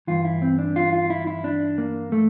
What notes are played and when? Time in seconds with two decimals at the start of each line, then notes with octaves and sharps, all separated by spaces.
0.07 G2 E3 F4
0.25 E4
0.42 C4
0.59 D4
0.76 F4
0.93 F4
1.10 E4
1.27 E4
1.44 D4
1.78 A#3
2.12 A3